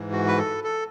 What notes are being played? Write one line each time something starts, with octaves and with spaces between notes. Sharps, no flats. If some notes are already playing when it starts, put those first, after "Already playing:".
Already playing: G#2 E3
F#4
B4
A4
A4